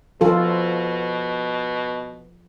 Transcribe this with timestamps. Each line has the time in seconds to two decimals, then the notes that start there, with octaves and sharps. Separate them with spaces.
0.21 B2 F3 F4 A4